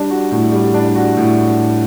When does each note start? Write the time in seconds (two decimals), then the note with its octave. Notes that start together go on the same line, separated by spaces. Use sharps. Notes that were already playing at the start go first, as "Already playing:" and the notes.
Already playing: G3 D4
0.10 F#4
0.31 A2
0.52 G3
0.74 D4
0.95 F#4
1.17 A2